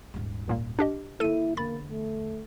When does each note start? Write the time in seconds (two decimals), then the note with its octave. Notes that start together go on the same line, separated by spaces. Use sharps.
0.14 D#1 G#2
0.48 C#2 A#2 A#3
0.79 D4 G4 D#5
1.20 D#3 A#3 E4 A4 D#7
1.57 E2 D3 A#3 B5 A6
1.89 A3